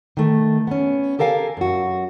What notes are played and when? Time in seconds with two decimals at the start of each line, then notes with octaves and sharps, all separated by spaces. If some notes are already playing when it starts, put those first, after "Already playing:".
0.17 D#3 A3
0.67 B3 C#4
1.19 G4 A4 A#4 F5 G5 G#5
1.57 F#2 F#4